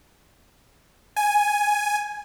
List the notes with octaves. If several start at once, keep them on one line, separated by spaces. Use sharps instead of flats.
G#5